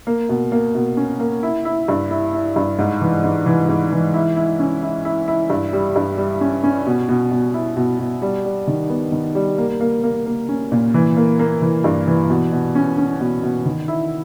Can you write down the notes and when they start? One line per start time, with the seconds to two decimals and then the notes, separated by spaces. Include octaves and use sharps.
0.07 A#3
0.29 B2
0.52 A#3
0.75 B2
0.97 C#4
1.20 A#3
1.43 E4
1.65 E4
1.88 G2
2.11 E4
2.33 E4
2.56 G2
2.79 G#2
3.01 E3
3.24 G#2
3.46 E3
3.69 G#2
3.92 E3
4.14 E4
4.36 E4
4.59 C#4
4.82 E4
5.05 E4
5.28 E4
5.50 G2
5.73 G3
5.96 G2
6.18 G3
6.41 C#4
6.64 C#4
6.87 B2
7.09 B2
7.31 B2
7.54 E4
7.77 B2
7.99 B2
8.22 G3
8.45 G3
8.68 D#3
8.89 B3
9.12 D#3
9.35 G3
9.58 A#3
9.80 A#3
10.04 A#3
10.26 A#3
10.49 C#4
10.72 A#2
10.94 E3
11.17 A#3
11.39 A#3
11.62 E3
11.84 G2
12.07 E3
12.30 B2
12.52 B2
12.75 C#4
12.98 C#4
13.21 B2
13.43 B2
13.65 D#3
13.88 E4